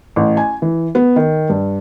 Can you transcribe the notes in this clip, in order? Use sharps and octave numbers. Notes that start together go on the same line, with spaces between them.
A1
G#5
E3
B3
D#3
G2